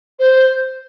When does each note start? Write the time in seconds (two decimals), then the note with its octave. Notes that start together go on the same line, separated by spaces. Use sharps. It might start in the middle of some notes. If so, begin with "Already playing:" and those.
0.19 C5